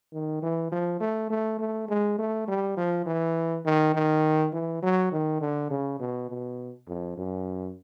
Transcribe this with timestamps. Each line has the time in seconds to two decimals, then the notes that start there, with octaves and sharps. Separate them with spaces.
0.13 D#3
0.42 E3
0.72 F3
1.00 A3
1.30 A3
1.59 A3
1.89 G#3
2.19 A3
2.48 G3
2.77 F3
3.06 E3
3.65 D#3
3.95 D#3
4.53 E3
4.82 F#3
5.12 D#3
5.41 D3
5.71 C#3
6.00 B2
6.30 B2
6.88 F2
7.18 F#2